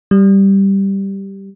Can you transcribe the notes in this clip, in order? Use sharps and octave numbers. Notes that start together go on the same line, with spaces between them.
G3